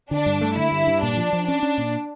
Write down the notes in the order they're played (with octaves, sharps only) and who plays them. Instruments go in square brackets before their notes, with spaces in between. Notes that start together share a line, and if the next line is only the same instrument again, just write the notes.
[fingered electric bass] D3 [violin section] D4
[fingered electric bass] G2
A3
[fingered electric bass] D3 [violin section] E4
[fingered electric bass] G2
G2
[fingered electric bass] A#2 [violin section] D4
[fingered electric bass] F3
F3
[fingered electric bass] C#4 [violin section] D4
[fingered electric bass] C#4
A#2